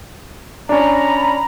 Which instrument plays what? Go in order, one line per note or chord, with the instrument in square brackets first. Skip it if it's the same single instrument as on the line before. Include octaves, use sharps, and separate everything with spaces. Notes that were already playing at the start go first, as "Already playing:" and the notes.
[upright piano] C#4 D4 [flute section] A#5 B5